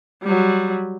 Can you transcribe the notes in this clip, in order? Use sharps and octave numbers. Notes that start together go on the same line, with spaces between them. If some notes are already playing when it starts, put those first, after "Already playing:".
F#3 G3